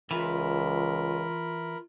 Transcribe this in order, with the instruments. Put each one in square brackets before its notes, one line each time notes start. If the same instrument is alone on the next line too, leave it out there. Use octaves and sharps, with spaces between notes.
[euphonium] C#2 [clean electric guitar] E3 [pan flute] F4 [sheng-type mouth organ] A#4 B5